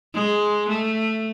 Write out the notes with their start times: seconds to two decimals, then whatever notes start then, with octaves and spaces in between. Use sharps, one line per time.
0.14 G#3
0.69 A3